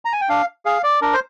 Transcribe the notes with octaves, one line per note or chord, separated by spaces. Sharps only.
A#5
G#5
G5
D4 F5
G#4 F5
D5
D4 A#4
C5